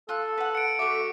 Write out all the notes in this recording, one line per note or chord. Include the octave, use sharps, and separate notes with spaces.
F4 A4 F#6
B4 F#5
C#7 D7
A3 F#4 E5 D6